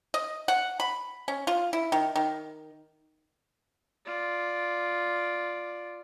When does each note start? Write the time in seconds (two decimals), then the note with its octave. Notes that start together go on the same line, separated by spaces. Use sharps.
0.14 D#5
0.48 F#5
0.80 B5
1.28 C#4
1.47 F4
1.73 E4
1.92 D#3
2.16 D#3
4.06 F4 D5